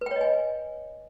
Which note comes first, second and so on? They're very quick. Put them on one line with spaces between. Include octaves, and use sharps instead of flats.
B4 G5 C#5 D#5 G#5